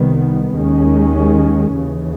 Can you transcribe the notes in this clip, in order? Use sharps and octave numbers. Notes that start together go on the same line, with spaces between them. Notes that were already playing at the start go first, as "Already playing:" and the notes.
Already playing: C2 C3 D#3 G3 B3
D#2 D#3 G#3 C#4
D#2 C#3 E3